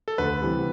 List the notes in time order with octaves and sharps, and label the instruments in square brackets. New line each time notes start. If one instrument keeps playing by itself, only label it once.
[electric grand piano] A4
[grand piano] D2 [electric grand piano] B4
[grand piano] C3 E3 G3